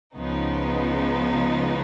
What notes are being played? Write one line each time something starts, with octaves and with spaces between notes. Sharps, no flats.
C#2 C#3 F3 B3 D#4